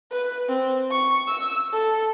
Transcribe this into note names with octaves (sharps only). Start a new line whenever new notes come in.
B4
C4
C#6
E6
A4